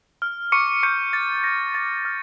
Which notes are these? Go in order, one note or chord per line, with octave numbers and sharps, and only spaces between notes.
F6
C#6 D6 C#7
C#6 G6 C#7
D6 A6
G6 A#6
D6 A6
F6